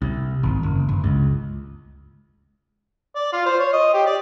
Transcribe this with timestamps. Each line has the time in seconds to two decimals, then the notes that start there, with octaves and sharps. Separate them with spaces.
0.02 C2
0.43 G#1
0.63 F#1
0.89 G1
1.04 C#2
3.16 D5
3.33 F4
3.46 C5
3.60 C#5
3.73 D#5
3.94 G4
4.06 D5